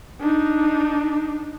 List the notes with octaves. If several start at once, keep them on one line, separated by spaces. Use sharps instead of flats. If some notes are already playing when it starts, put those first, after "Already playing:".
D4 D#4